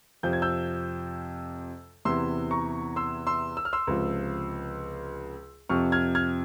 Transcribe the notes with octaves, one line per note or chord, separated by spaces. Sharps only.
F2 C3 F3 G6
G#6
E6 G6
E2 C3 E3 C6 E6
A#5 C#6
C6 E6
C6 E6
E6
F6
C6 E6
C#2 C3 F3
F2 C3 F3 C#6 F6
F6 G#6
F6 G#6